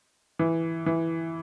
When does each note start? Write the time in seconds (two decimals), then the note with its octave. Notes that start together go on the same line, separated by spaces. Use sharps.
0.39 E3
0.86 E3